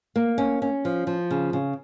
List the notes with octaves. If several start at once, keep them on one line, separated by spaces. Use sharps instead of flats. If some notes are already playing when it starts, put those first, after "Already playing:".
A#3
C#4
C#4
F3
F3
C#3
C#3